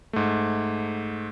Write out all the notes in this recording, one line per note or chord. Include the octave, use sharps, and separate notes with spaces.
G#2 A3